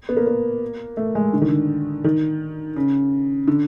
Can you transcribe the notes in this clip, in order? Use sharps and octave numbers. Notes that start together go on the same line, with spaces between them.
B3
A#3
A#3
A3
G#3
D3
D#3
D3
D#3
C#3
D3